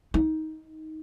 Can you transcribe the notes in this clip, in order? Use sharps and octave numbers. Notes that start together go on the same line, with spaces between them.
D#4